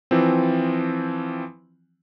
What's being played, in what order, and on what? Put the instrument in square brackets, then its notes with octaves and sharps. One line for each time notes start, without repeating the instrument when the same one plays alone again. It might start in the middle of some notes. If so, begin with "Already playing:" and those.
[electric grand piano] E3 F3 C4